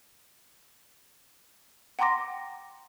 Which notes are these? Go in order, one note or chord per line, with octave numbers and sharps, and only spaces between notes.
F#5 G5 A#5 C6 D6 A#6